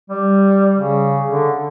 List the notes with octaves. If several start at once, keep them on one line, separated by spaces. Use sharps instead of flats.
G3
C#3
D3